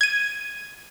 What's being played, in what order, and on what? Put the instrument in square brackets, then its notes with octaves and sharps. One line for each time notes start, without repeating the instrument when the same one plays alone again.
[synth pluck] G#6 D#7